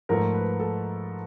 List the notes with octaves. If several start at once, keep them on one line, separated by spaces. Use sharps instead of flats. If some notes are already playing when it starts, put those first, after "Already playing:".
G#2 F3 A3 A#4
B4
A4